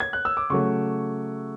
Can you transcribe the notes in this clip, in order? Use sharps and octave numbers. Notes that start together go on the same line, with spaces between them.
G#6
F#6
E6
D6
C#3 F#3 A3 C#6